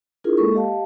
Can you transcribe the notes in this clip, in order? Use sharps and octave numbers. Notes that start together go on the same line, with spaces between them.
D4 E4 F4 G#4 A#4
G#3 A#3 A4 C#6
G4 D#5 F5 A5